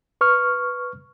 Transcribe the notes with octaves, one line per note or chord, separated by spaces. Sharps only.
B4 C#6 F6